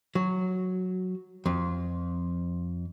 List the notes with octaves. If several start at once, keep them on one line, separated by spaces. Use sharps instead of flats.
F#3
F2